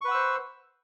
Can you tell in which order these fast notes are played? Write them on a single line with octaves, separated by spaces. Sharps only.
C#6 B4 F#5 E6 C5